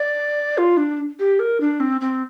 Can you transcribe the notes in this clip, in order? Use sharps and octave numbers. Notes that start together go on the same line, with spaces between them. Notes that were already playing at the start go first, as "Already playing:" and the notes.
Already playing: D5
F4
D4
G4
A#4
D4
C4
C4